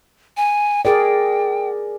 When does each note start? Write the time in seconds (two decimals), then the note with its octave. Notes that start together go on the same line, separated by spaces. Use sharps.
0.37 G#5
0.85 G#4 A#4 D5 G5